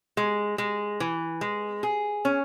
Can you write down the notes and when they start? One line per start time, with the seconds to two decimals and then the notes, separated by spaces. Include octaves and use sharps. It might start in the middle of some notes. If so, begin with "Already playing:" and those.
0.17 G#3
0.58 G#3
1.00 E3
1.41 G#3
1.83 G#4
2.25 C#4